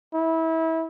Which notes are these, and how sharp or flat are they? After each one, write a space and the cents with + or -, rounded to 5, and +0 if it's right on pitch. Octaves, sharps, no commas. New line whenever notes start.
E4 -25